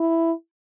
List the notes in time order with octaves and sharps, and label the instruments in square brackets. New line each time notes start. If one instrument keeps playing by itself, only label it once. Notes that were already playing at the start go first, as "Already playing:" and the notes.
Already playing: [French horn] E4